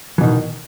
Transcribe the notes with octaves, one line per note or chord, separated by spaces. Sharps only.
B2 D#3 E3